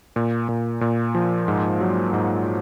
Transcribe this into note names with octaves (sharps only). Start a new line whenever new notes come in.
A#2
A#2
A#2
F3
G#2
F#3
G#2